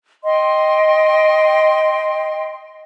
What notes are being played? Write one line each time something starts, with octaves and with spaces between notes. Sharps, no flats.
D#5 G5 C6